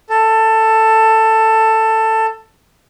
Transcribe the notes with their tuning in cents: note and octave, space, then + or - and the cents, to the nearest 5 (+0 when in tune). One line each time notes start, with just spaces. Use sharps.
A4 +10